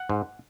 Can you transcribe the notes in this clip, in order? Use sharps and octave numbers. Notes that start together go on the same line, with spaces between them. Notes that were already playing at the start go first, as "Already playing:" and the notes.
Already playing: F#5
G#2